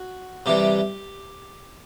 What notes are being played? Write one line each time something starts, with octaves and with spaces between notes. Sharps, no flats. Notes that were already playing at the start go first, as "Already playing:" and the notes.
Already playing: F#4
C3 E3 G3 G4